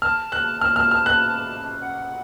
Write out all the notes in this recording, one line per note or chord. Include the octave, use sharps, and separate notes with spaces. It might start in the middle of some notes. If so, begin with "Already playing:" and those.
A5 F6
F#6
F6
F6
F6
F#6
F#5